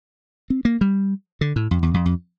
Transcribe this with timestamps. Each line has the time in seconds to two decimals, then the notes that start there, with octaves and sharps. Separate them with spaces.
0.50 C4
0.65 A#3
0.81 G3
1.41 D3
1.56 A2
1.71 F2
1.83 E2
1.94 F2
2.06 F2